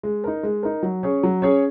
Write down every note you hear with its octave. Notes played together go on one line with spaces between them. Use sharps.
G#3
D#4 A#4
G#3
D#4 A#4
F#3
C#4 G#4 C#5
F#3
C#4 G#4 C#5